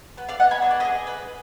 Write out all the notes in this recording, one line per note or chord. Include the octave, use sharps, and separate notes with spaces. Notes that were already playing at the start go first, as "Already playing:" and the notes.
B3 B4
D5 F5
B3 D#5 F#5
G#5 B5
D4 D#5
D5
B4 D#5
G#4
B3 B4